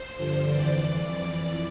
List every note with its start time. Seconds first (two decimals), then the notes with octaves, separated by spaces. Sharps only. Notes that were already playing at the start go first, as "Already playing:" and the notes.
Already playing: C5
0.16 G2 D3 F3
0.51 F2 E3 D5